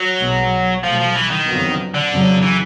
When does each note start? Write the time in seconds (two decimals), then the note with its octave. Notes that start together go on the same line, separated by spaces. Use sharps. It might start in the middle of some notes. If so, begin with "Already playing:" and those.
Already playing: F#3
0.19 B1 B2 G#3 B3
0.83 C2 B2 F3 F#3 A3
0.99 F3
1.15 E3
1.31 D#3
1.47 F2 D3 F#3 B3
1.94 D3
2.11 F2 C#3 F#3
2.42 E3